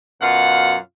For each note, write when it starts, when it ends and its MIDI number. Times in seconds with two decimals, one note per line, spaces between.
0.22 0.77 42
0.22 0.77 47
0.22 0.77 65
0.22 0.77 77
0.22 0.77 78